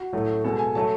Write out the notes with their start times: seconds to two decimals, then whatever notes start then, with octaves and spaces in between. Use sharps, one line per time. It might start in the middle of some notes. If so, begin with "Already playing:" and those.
Already playing: F#4
0.13 A2 F#3 A3
0.44 B2 G#3 A4
0.59 G#5
0.75 F#3 A3 A5